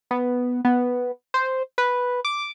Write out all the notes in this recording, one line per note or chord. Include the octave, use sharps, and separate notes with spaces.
B3
B3
C5
B4
D6